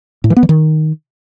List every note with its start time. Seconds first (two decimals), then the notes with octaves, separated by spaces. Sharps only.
0.24 A2
0.30 E3
0.37 B3
0.43 E3
0.49 D#3